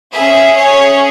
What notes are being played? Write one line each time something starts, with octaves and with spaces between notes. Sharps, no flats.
C#4 G#4 E5
C#5